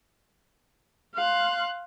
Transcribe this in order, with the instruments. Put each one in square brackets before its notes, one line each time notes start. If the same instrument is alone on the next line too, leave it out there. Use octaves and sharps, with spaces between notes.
[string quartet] F5 C6 F#6